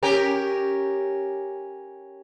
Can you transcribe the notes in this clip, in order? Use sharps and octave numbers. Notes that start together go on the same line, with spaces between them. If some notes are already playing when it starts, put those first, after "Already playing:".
C#4 G4 A#4